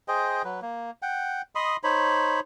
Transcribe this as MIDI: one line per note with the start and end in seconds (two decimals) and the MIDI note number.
0.08 0.42 68
0.08 0.42 72
0.08 0.42 75
0.08 0.42 79
0.44 0.60 54
0.44 0.60 71
0.62 0.91 58
1.02 1.42 78
1.02 1.42 79
1.55 1.77 75
1.55 1.77 83
1.55 1.77 84
1.55 1.77 87
1.84 2.40 63
1.84 2.40 72
1.84 2.40 73
1.84 2.40 83